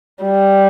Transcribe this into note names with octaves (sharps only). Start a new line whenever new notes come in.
G3